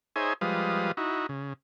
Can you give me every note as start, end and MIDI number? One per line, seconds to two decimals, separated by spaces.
0.16 0.33 63
0.16 0.33 68
0.16 0.33 72
0.16 0.33 73
0.16 0.33 76
0.16 0.33 80
0.41 0.92 53
0.41 0.92 55
0.41 0.92 56
0.41 0.92 71
0.41 0.92 77
0.41 0.92 87
0.97 1.27 63
0.97 1.27 64
0.97 1.27 66
1.29 1.53 49